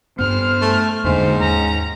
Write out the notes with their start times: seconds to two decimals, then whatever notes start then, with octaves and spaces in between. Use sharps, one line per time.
0.19 G2 B3 C5 F6
0.61 A3
1.04 E2 G#2 D3 A#3 C5
1.39 D#2 C#4 A#5